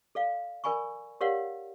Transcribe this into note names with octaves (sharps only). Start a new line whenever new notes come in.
A4 D5 F5
A#4 D5 G#5 B5 C#6
G4 A#4 C#5 D5 F5 F#5